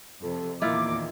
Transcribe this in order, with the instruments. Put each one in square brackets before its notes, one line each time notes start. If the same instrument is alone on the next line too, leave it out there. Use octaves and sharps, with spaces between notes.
[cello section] F2 C3 [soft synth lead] A4
[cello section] E2 A#2 D#3 [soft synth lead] A#3 [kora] E4 F4 [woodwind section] D6